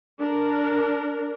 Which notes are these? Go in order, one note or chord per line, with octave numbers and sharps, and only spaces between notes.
D4 A#4